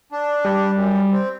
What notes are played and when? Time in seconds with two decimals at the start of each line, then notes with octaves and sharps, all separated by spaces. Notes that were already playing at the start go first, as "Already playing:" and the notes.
0.12 D4
0.45 G3
0.74 F#2
1.12 C4